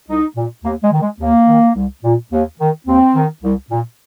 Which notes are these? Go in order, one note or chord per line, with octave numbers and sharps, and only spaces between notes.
C2 D#4
A#2
D#2 A#3
G#3
D#3
G#3
D#2 A#3
D#3
C2
A#2
D#2
D#3
D#2 C4
D#3
C2
A#2